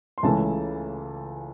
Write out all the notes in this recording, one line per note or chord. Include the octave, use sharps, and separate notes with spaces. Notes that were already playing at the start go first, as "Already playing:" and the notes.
C6
C#2 C#3 E3 A3 A5